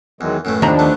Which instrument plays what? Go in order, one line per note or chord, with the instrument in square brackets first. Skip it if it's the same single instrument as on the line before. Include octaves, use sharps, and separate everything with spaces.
[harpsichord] E2 [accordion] D#3 F#3 G#3
[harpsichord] F#2 A2 A3 [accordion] E3
[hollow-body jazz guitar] D#2 A#5 B5 [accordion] F3 D4
[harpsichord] A3 B3